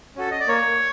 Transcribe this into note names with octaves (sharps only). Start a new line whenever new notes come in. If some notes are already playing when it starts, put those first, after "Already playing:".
C#4 F#4 A4
D#5
D5
A#3 C#5